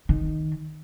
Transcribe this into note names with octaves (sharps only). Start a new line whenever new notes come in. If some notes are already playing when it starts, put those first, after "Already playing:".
D#3